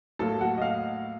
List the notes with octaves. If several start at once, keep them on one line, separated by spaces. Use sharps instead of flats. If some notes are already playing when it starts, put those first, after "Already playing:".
A2 F#3 A#3 A4 A5
F#4 F#5
D#5
F5